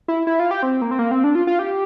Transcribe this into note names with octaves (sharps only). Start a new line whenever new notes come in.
E4
E4
F4
G4
C4
A#3
C4
A#3
C4
D4
F4
F4
G4